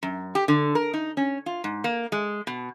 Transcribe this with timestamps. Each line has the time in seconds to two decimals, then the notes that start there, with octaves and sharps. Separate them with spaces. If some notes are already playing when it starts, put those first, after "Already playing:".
0.03 F#2
0.35 G4
0.48 D3
0.75 A#4
0.94 D#4
1.17 C#4
1.46 F4
1.64 G#2
1.84 A#3
2.12 G#3
2.47 B2